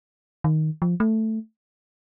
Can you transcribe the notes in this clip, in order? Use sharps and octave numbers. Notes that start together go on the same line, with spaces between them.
D#3
F3
A3